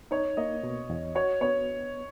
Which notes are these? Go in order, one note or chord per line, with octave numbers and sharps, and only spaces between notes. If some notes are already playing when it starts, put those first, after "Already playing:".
D#4 C#5
A#3 D#5
B2
E2
F#4 C#5
B3 C#5